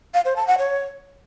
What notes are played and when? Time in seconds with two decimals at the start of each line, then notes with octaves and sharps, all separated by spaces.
0.14 F5
0.25 C5
0.36 A5
0.47 F#5
0.58 C#5